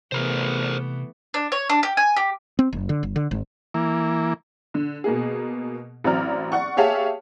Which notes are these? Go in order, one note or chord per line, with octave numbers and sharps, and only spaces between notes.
C3 E3 A3 B3 G#4 A#4 C5
D4
C#5
D4
G4
G#5
G4
C4
F#1
D3
G1
D3
G#1
E3 A#3
D3
B2 A#3 G#4
A1 F#3 C4 D5 A#5 F6
D5 F#5 C#6
G4 G#4 C#5 E5 F5 A5